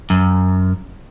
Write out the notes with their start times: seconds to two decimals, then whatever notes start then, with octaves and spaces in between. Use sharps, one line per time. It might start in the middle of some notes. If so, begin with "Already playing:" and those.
0.10 F#2